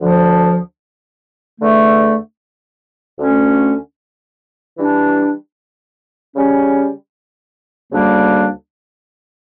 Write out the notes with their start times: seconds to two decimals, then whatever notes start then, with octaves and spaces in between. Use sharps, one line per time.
0.01 D2 D3 F3
1.61 E2 D3 A3
3.19 D2 D3 A3 C#4
4.77 E3 G3 D4
6.34 C#3 G3 C#4
7.92 D2 C#3 G3 A#3 D4